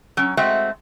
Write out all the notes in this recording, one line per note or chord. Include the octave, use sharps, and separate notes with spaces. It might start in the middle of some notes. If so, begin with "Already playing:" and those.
F#3 C#4
G#3 A3 C4 F#4 E5